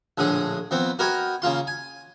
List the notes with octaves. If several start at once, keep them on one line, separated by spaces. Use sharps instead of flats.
A#1 A2 D3 G#4 D#6
F2 B3 C4 B4
F#4 A#4 B4 D#5 G5 G#5
C#3 A#3 F4 C6
G#5